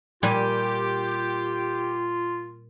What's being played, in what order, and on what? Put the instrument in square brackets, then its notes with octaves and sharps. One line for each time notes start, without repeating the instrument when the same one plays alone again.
[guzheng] A#2 G3 G#5 [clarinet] F4 [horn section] G4